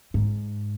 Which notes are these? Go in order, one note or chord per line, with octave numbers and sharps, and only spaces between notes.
G#2